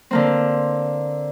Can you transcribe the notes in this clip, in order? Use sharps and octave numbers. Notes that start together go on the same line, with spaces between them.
D3 A#3 C4